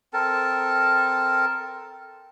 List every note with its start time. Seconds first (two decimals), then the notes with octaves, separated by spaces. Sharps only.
0.13 C4 A4 A#4 A5